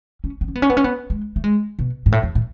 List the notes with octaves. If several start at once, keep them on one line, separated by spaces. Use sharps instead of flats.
C#4
B3
C#4
B3
C#4
B3
C#4
B3
G#3
A3
G#3
B2
G#2
A2
E2
A2